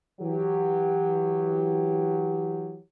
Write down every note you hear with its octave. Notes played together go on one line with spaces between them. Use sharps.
E3 F#3 G4